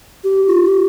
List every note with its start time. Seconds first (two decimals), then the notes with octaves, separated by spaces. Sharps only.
0.24 G4
0.47 F4
0.65 G4